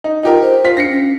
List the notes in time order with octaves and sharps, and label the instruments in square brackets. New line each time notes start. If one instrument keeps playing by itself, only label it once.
[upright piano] D#4
[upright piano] D#4 G4 A#4 [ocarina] F4
[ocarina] C5
[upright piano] F4 B6
[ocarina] D4 [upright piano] A#6 C7 C#7
[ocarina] C#4